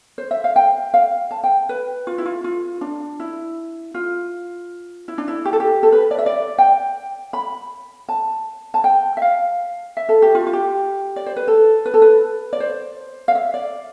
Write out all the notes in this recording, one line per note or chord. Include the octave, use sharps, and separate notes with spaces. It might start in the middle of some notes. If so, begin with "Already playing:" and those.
C5
E5
F5
G5
F5
A5
G5
B4
F4
E4
F4
F4
D4
E4
F4
E4
D4
E4
G4
A4
G4
A4
B4
D5
E5
D5
G5
B5
A5
A5
G5
E5
F5
E5
A4
G4
F4
F4
G4
D5
C5
B4
A4
B4
A4
B4
D5
C5
F5
E5
D5